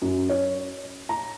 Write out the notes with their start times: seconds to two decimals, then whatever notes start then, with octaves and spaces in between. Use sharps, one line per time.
0.02 F#2
0.29 C#5
1.09 A#5